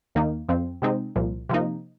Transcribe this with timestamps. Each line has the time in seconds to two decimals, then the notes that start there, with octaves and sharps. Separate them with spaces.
0.15 D#2 D#3 A#3 D#4
0.49 F2 F3 C4
0.82 C3 G#3 C4 D#4
1.16 C2 A#2 F3
1.49 C3 F3 A#3 D#4